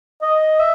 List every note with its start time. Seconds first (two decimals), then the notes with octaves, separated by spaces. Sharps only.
0.22 D#5
0.60 E5